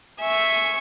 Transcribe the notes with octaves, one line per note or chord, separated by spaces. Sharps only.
E5 G#5 C#6